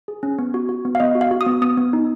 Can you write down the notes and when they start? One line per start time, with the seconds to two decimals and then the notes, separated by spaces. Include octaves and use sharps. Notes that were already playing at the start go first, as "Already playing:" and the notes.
0.08 G#4
0.23 C#4
0.39 B3
0.54 F#4
0.69 F#4
0.85 B3
0.95 F5
1.00 B3 D#5
1.15 F#4
1.21 F5
1.31 F#4
1.41 D#6
1.46 B3
1.62 B3 D#6
1.77 B3
1.93 D#4